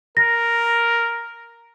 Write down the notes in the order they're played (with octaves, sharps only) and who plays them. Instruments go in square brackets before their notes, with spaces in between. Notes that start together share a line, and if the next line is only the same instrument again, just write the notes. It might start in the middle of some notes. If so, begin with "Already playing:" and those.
[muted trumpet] A#4 [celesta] A#6